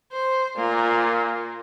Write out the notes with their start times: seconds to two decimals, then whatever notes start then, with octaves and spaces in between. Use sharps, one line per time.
0.12 C5
0.57 A#2 A#3 F4